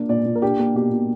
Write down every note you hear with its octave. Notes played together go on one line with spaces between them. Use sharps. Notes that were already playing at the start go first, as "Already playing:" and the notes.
Already playing: A#3 D4
A#2 D5
A#2
A#4
D4 G4
A#3
B2 G4
B2